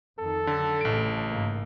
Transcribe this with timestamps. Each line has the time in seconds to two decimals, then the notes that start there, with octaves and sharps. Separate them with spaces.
0.19 F2 D#3 A4
0.47 D3 F#3
0.81 A1 A2 C#3 D7
1.31 G#2 A#3